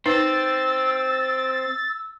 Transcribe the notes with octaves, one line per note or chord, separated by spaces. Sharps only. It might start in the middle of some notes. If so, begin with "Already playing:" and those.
C4 D#4 B4 E6 A6